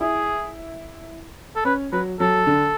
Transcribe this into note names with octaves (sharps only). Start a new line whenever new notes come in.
E4 G#4
A4
C#4 B4
F#3 B4
F#3 A4
D3